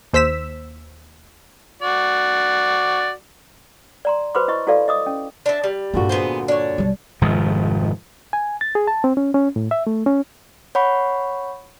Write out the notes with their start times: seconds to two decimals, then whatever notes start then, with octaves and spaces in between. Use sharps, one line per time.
0.13 D#2 C5 E6 B6 E7
1.82 F#4 D5
4.05 D5 A#5 C6
4.35 F#4 B4 C5 B5 C6 D6
4.48 E4 D#5 C#6
4.67 E4 F#4 A4 D5 F5
4.88 D#5 D6 D#6
5.06 C#4
5.46 D4 E5
5.64 G3
5.94 G2 A#2 D3 C4 F#4
6.09 B3 G#4 C5
6.48 D4 C#5
6.78 B1 G3
7.21 F1 G#2 D#3 F3
8.33 G#5
8.61 A6
8.75 G#4
8.88 A5
9.04 C4
9.17 C#4
9.34 C#4
9.56 A2
9.71 E5
9.87 A3
10.06 C#4
10.75 C#5 F#5 B5 C#6